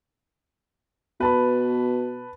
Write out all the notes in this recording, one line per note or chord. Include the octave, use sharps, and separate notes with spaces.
B2 B4 A5 B5